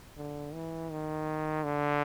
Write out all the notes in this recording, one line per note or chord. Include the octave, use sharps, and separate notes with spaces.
D3
E3
D#3
D3